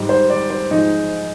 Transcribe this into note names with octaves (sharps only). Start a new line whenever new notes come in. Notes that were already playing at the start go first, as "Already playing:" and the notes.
Already playing: G#2 G3
C5
D5
C5
G#2 F3 G#3 D#4